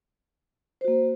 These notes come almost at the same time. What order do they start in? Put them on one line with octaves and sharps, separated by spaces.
C5 F#4 A#3